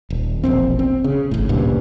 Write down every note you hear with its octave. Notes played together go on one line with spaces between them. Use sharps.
D#1
E1 A#1 C4
C4
C#3
G#1 A2
D2 G2 A#2 C#3